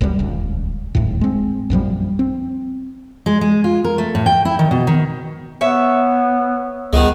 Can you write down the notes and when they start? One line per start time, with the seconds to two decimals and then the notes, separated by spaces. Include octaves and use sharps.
0.01 F#1 C#2 F#2 G3
0.19 D#1 C#2
0.95 D1 G#1 D#2 A2
1.21 G#3 C4
1.70 A#1 F#2 F3 G3
2.19 C4
3.26 G#3
3.41 G#3
3.64 F4
3.84 A#4
3.98 A3
4.15 A2
4.26 G5
4.45 E4
4.59 D#3
4.71 B2
4.87 D#3
5.61 B3 C#5 E5
6.93 C#2 D#3 G#3 B3